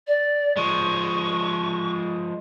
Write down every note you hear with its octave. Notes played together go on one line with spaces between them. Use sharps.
D5
F3 G#3 C#6